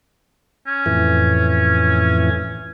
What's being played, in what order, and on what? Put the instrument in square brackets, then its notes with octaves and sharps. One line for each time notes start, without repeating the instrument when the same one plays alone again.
[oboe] C#4
[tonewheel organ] F2 A2 E3